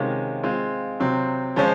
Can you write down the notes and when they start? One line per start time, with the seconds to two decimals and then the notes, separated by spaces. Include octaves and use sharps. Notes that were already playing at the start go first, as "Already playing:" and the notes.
Already playing: C3 D#3 G#3 C#4 F4
0.43 G#3 C4 F4
1.00 C3 F#3 C4
1.56 F3 G#3 C#4 F4 C5